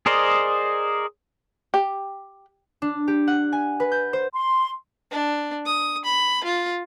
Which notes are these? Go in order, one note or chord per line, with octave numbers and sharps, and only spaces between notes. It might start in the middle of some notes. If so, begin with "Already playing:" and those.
G#4 A#4 C5 D5 D#5
G4
D4
G4
F#5
G#5
B4
G6
C5
C6
D4
D#6
B5
F4